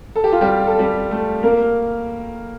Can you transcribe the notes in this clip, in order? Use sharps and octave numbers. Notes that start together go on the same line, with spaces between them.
A4
G4
F4
G3 G4
A4
G3 G4
A3 A4
A#3 A#4